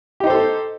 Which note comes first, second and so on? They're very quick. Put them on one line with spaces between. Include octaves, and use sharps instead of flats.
G4 D#4 C5 A4